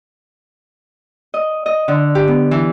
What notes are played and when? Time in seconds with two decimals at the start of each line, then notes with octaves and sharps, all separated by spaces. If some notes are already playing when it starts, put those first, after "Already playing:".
1.34 D#5
1.66 D#5
1.88 D3
2.15 G4
2.28 B3
2.51 E3